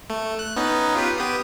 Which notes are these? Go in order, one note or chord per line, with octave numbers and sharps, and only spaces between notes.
A3
F#6
B3 C#4 D#4
F4 G4 B4
B3 G4 D#6